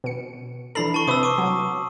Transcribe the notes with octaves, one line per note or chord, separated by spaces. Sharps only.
B2 C#7
E3 D4 A4 B5 C7 F#7
A5 C#6
C3 B4 D#6 E6
C#6 D6 D#7
F#3